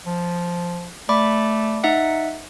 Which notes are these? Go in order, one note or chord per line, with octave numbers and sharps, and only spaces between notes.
F3
A3 D5 B5 D6
D#4 E5 F#5